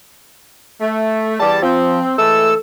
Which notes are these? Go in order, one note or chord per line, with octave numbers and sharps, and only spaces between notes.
A3
E2 G3 A5
F3 C4
E3 G#3 A3 A4 E6